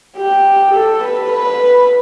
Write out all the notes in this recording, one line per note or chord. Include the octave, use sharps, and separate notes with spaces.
G4
A4
B4
B4